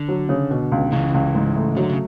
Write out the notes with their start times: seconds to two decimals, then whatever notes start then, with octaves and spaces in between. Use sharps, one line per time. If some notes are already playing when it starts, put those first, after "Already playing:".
Already playing: D3
0.09 F#3
0.29 C#3
0.51 B2
0.72 C#2
0.92 C#2 C#3 E3
1.14 C#2
1.35 G#2
1.56 A3
1.76 D3 F#3
1.89 C#3